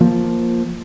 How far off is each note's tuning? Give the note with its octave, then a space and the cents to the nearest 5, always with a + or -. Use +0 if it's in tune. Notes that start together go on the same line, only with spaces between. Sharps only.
F3 +0 A#3 +0